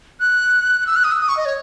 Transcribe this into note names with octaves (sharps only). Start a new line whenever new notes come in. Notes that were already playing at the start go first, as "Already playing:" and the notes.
F#6
F#6
E6
F#6
D#6
E6
D#6
C#6
D#5
C#5